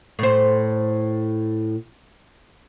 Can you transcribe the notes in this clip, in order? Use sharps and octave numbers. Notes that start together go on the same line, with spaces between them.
A2 C5